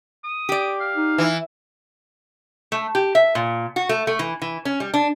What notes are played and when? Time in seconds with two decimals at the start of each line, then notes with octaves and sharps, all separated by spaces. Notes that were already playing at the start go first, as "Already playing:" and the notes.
0.24 D#6
0.49 G4 D5
0.81 F5
0.96 D#4
1.18 E3
2.72 A3
2.95 G4
3.15 E5
3.35 A#2
3.76 F#4
3.89 A3
4.07 A3
4.19 E3
4.42 E3
4.65 C#4
4.80 G3
4.94 D4